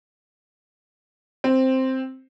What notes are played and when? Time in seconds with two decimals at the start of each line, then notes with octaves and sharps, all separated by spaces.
1.44 C4